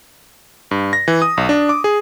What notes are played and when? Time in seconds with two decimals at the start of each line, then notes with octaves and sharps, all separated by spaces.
0.71 G2
0.93 A#6
1.08 E3
1.22 D#6
1.37 B1
1.49 D4
1.69 D6
1.84 G#4